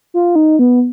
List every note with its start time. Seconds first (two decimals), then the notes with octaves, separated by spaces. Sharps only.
0.14 F4
0.36 D#4
0.59 B3